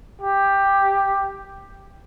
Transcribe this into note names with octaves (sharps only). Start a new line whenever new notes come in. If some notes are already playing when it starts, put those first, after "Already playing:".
G4